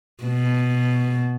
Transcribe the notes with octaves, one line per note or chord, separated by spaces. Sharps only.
B2